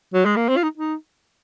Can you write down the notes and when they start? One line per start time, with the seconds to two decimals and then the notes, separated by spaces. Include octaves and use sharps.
0.14 F#3
0.25 G#3
0.36 A#3
0.49 C4
0.57 F4
0.63 D#4
0.78 D#4